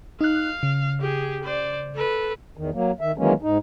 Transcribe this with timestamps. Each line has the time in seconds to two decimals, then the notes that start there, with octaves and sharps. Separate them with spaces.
0.21 D#4 F5 F#6
0.63 C#3
1.01 G4 G#4
1.44 C5 D5
1.95 A4 B4
2.57 E2 D#3
2.74 F#3 A#3
3.01 D#3 E5
3.18 D#3 E3 F#3 G#3 A#3 C#4
3.42 G#2 D#4